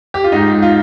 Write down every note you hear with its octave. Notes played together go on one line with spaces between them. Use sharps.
G4
F4
G#2 D#4
G#2
F4